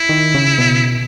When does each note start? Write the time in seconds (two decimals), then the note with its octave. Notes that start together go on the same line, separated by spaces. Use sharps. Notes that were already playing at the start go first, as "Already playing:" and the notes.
Already playing: E4
0.09 D#3
0.34 C#3
0.58 B2